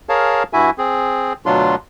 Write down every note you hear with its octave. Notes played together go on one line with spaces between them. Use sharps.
G#4 A#4 C#5 F5 A5
G2 E4 F#4 E5 G#5
C4 G#4
D2 B2 F#3 D4 F4 C6